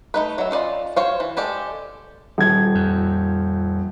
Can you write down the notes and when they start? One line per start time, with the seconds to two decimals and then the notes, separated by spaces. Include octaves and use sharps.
0.14 A3 D#4 B4
0.38 F#3 E5
0.51 C#4 F4 D5 D#5
0.96 F#4 C5 C#5 F5
1.20 E3
1.37 G#3 G4 A4 D5
2.38 D#1 G#6
2.75 F2